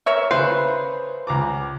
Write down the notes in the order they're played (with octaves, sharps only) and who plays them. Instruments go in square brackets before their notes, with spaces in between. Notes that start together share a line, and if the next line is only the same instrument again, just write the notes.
[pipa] A#4 C#5 E5
[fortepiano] C#3 [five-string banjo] B4 C5
[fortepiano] C#2 A#5 D6